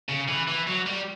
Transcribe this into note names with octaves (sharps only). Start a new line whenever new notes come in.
C#3
E3
E3
F#3
G3